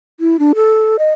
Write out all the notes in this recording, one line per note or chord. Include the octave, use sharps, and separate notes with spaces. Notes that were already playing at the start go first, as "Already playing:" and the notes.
E4
D4
A4
D#5